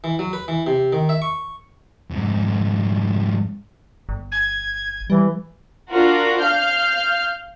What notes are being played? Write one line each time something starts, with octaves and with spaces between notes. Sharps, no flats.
E3
F#3
B4
E3
C3
D#3
E5
C#6
F2 G#2
G1
G#6
E3 G3
D4 F4 F#4 A#4
F5 F6 G6